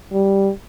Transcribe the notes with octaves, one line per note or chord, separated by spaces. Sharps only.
G3